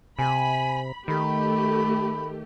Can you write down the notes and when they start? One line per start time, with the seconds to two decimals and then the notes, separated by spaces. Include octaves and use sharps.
0.19 C3 G#5 B5
1.08 D#3 A3 G4 B5